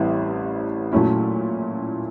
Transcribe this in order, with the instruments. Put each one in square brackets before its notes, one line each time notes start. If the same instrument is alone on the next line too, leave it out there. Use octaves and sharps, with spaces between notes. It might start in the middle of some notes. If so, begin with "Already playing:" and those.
Already playing: [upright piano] A1 A2 E3 G3 C4
A#2 F#3 A3 C#4 E4